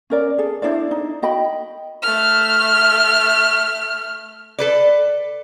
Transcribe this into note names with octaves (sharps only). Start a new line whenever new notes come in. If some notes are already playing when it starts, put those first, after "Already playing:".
C#4 A#4 D5
G#4 A4
D4 E4 C5 D5
D#4
F#4 D#5 G5 B5
A3 F6
A4 B4 D5